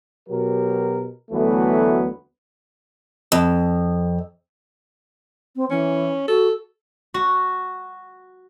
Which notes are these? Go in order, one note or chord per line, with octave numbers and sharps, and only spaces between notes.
B2 F#3 G4 A#4
D2 E3 F#3 A3 B3
F2
C4
E3 C#4
F#4 A4
F#4